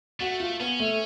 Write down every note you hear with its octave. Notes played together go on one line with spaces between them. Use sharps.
A3 F#4
F4
B3 C#4
A3